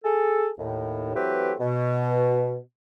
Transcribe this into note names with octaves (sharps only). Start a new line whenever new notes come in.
G#4 A4
D#2 A2
E3 F#3 A3 C4 G4 B4
B2